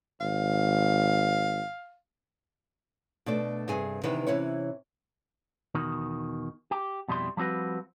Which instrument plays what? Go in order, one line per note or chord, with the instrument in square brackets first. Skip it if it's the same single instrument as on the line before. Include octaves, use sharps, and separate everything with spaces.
[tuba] G#1 [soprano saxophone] F5
[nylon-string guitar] B2 A3 D4 D5
G2 C3 G#4 G#5
C3 D#3 E3 B3 D4 B4
C3 E3 C#4 E4 C#5
[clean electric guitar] E2 B2 D#3
G4
F2 B2 G3 E4 C6
F3 G3 C4 F#4 B4